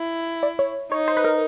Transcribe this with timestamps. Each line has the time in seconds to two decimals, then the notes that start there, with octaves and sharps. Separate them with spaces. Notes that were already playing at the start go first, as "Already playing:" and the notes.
Already playing: E4
0.43 D5
0.59 C#5
0.92 D#4 C#5
1.08 C5
1.17 B4
1.25 A#4